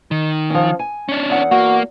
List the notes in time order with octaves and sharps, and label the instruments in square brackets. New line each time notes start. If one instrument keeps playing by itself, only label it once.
[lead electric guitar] D#3
[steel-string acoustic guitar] F3 C#4
G#5
[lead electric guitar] C#4 D4
[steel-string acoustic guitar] E2 F#5
[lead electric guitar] A#3 [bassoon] F#4